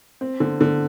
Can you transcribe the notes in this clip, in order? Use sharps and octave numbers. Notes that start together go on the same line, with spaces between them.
C4
D3
D3